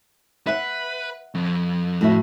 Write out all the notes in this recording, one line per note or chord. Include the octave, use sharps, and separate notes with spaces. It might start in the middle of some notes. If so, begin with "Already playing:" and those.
B4 E5 F#5
F2
A2 F#4 E5